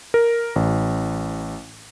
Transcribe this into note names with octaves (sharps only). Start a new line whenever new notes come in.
A#4
A1